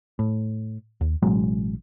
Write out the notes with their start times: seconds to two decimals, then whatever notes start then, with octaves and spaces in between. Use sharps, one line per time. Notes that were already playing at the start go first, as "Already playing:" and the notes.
0.19 A2
1.01 D#2
1.22 A1 B2 F#3 G#3